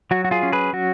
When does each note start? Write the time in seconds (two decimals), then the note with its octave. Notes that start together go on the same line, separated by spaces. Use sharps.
0.11 F#3 F#4
0.25 F#4
0.31 F4 G#4
0.43 C#4
0.52 G#4 B4
0.73 F#3 F#4